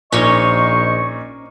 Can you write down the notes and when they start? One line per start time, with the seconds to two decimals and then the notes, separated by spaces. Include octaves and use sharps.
0.12 A#1 A#2 C#4 D#4 C5 C#5 D#5 C#6